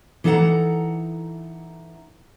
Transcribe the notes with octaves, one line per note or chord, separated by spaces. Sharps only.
E3 D#4 A4 A#4 F#5 A#5